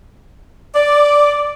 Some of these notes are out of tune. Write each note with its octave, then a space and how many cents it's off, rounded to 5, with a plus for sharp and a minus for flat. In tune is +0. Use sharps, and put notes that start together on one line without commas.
D5 -5